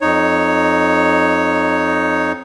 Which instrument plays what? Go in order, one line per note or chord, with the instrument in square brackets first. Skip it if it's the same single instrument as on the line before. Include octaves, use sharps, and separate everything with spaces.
[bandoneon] F2 D#4 C#5